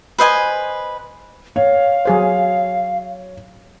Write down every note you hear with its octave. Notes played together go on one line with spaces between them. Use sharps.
B4 C5 D#5 G#5
C#5 F5
F#3 G#4 C5